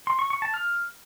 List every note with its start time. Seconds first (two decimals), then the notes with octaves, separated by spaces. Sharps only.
0.07 C6
0.19 C#6
0.30 C#6
0.42 A5
0.54 F6